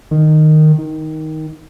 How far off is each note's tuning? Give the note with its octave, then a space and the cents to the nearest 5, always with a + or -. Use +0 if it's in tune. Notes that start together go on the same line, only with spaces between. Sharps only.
D#3 -10
D#3 +10